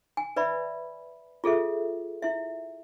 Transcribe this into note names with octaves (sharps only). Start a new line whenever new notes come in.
G#5
B4 D5 E5 B5
F4 G#4 A4 E5
E4 E5